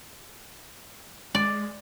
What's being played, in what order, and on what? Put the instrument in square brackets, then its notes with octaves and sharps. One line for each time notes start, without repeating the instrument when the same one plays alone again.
[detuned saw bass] G#3 [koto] D5